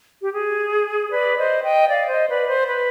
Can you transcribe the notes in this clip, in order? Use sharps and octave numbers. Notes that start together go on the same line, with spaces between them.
G4
G#4
B4 D5
C5 D#5
D#5 G5
D5 F5
C5 D#5
B4 D5
C5
B4